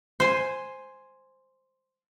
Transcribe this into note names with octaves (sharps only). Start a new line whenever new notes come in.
C5 G#5